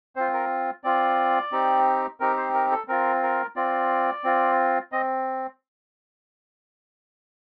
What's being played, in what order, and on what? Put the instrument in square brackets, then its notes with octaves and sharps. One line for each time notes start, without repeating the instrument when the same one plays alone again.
[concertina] C4 F4 C5
A#4
C4 F4 D5
C4 D#4 G4
C4 D#4 G4 A#4
C5
A#4
A4
C4 F4 A#4
A#4
C4 F4 D5
C4 F4
C4 D#5